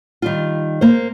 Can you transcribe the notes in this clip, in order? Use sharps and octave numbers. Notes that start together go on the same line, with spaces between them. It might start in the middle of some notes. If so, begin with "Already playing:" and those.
D#3 G3 F4
A#3 C5